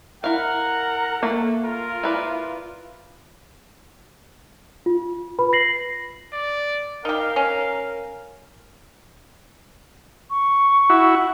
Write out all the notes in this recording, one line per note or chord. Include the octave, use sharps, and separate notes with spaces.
E4 A#4 F5 F#5
A3 A#3 A4
F4 A#4
E4 B4 D5
F4
B4 B5
A#6 C7 F#7
D5
D#4 G4 A#4 F5
C#4
C#6
E4 F#4